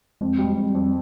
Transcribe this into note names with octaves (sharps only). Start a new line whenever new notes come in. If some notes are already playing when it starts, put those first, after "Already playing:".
F2 G#3
G3
G#3
F2
G3
F2